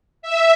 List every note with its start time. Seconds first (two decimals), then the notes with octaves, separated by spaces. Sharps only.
0.22 E5